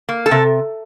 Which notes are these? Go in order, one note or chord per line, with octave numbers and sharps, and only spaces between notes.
A#3
A4
C3